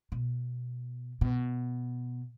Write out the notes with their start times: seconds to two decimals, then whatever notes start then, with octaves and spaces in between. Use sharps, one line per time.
0.12 B2
1.21 B2